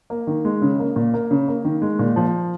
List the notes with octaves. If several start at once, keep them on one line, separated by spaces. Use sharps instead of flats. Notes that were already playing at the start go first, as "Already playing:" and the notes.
A#3
D#3
G#3
C#3
A#3
A#2
A#3
C#3
A#3
D#3
G#3
A#2
F3